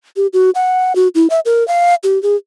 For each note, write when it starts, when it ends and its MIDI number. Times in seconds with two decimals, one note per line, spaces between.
0.17 0.27 67
0.33 0.50 66
0.55 0.95 78
0.96 1.08 66
1.15 1.27 64
1.30 1.40 76
1.45 1.66 70
1.68 1.95 77
2.03 2.21 67
2.23 2.36 68